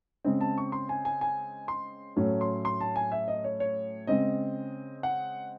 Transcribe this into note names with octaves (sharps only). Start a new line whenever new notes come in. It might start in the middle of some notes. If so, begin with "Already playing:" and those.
C#3 G#3 C4
A5
C#6
C6
G#5
G#5
G#5
C6
A2 F#3 A3 C#4
C6
C6
A5
G#5
E5
D#5
C#5
C#5
C#3 G#3 C4 D#5
F#5